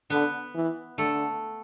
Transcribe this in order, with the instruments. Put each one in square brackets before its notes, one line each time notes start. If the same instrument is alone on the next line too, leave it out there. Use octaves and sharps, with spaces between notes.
[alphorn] D3 [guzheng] B3 B4
[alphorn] E3
[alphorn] D3 [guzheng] A3 A4